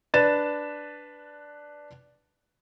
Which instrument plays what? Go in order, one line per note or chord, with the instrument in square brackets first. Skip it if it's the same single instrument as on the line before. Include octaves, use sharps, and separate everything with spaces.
[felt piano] D4 B4 A6 E7